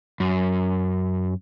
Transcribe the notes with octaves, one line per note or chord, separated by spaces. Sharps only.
F#2